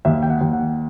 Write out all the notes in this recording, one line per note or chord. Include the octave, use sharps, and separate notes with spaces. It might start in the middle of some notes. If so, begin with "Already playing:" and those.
D#2 E5
G5
F#5
D#2
F#5